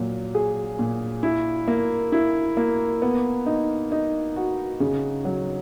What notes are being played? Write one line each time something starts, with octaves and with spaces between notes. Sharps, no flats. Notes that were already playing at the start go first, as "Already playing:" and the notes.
Already playing: A#2 F#3
G#4
A#2
E4
A#3
E4
A#3
B3
D#4
D#4
F#4
C#3
F#3